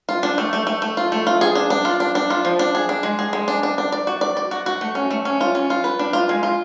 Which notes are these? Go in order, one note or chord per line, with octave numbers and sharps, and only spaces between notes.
F4
D4
A3
A3
A3
A3
F4
A3
F4
G#4
D4
D4
F4
D4
D4
F4
F3
D4
G#4
D4
G#3
G#4
G#3
D4
D4
D4
D5
F#4
D5
D5
F#4
F#4
A3
C#4
A3
C#4
F4
C#4
F4
B4
D4
F4
G#3
F4